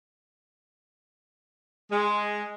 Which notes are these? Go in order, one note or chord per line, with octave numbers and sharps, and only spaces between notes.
G#3